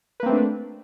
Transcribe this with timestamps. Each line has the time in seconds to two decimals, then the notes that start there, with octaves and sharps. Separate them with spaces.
0.20 B4
0.23 A#3
0.26 C4
0.29 A3
0.32 D4